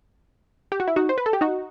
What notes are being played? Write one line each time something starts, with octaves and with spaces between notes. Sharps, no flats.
G4
F#4
E4
D#4 F#4
C5
B4
A4
G4
D#4 F#4